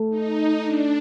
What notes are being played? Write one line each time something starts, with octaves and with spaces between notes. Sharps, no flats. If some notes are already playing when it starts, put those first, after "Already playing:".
Already playing: A3
D#4
D4